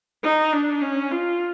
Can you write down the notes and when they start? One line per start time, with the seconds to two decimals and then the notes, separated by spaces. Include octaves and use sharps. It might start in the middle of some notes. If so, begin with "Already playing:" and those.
0.24 D#4
0.53 D4
0.82 C#4
1.11 F4